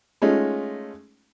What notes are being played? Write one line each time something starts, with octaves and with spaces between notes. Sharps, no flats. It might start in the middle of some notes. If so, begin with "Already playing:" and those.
G#3 A3 C#4 D#4 F4